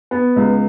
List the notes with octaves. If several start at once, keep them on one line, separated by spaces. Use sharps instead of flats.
B3
C#2